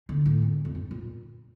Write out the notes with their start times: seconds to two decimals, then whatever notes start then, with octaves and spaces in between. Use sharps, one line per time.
0.09 D3
0.26 A2
0.42 E2
0.65 F2
0.75 G2
0.91 A#2